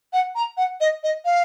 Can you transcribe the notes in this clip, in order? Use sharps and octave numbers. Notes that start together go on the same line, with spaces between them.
F#5
A#5
F#5
D#5
D#5
F5